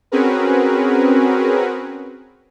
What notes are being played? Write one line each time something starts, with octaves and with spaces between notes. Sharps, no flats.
C4 C#4 F#4 G#4 A#4 B4